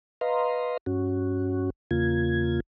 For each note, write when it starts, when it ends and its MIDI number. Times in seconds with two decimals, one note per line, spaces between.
0.21 0.77 71
0.21 0.77 75
0.21 0.77 77
0.21 0.77 82
0.21 0.77 84
0.86 1.70 43
0.86 1.70 61
0.86 1.70 66
1.91 2.60 40
1.91 2.60 49
1.91 2.60 58
1.91 2.60 65
1.91 2.60 92